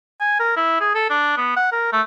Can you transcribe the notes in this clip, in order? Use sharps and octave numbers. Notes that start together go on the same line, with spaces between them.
G#5
A#4
E4
G#4
A4
D4
B3
F#5
A#4
A3